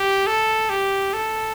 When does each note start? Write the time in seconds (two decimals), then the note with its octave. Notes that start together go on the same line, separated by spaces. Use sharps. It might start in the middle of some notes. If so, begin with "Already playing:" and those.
Already playing: G4
0.27 A4
0.70 G4
1.13 A4